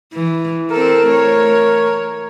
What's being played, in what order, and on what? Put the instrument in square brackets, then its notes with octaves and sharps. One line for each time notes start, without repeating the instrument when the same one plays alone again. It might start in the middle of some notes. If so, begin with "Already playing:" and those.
[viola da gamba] E3
[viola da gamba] C4 A4 [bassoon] A#4
[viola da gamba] A3 C#5